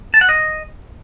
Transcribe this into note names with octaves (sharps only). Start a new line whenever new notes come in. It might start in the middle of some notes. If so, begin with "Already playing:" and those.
A5
F#5
D#5